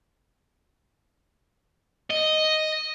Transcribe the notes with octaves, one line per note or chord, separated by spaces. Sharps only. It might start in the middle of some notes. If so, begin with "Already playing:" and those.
D#5